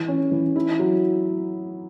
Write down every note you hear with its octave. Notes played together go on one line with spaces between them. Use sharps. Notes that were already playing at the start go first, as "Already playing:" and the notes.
Already playing: E3
C#4
E3
E4
F#3